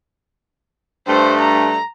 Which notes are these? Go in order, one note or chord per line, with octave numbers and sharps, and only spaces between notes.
G2 A3 C5
A#5